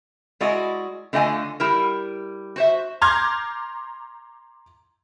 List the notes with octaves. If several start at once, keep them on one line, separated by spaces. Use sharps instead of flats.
G#3 E4 F#4 D5 D#5
D3 A3 F4 D#5 G5 G#5
G3 E4 A#4
F#4 C5 E5
A#5 C6 D6 F6 G6 G#6